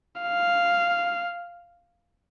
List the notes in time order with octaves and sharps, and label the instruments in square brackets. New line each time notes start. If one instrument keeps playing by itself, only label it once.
[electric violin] F5